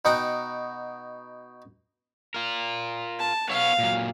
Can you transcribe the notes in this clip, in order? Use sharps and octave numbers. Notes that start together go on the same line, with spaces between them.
B2 D#4 F#5 G5
F4 A#4
A5
B3 C#5 F5
A#2 F#3